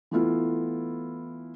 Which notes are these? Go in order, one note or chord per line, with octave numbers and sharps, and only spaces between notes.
E3 A3 B3 E4 F4